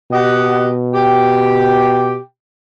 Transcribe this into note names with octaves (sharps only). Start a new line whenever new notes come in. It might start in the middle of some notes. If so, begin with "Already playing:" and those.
B2 G4 D#5 F#5
G4 G5